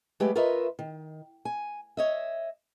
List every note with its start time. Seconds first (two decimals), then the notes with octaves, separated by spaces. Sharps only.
0.20 F#3 G#3 A3 G4 B4
0.35 F4 A#4 B4 C#5 D#5 E5
0.79 D#3
1.45 G#5
1.97 C#5 D#5 E5